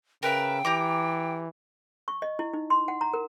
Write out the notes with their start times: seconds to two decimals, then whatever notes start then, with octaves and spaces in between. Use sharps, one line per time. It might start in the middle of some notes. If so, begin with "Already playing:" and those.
0.23 C#3 A#4 B4 E5 G5
0.65 E3 G4 A#5 D6
2.08 C#6
2.22 D#5
2.39 E4
2.54 D#4
2.70 C6
2.88 F#5
3.01 A#5
3.14 A#4